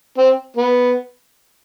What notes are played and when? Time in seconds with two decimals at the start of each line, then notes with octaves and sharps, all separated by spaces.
0.18 C4
0.57 B3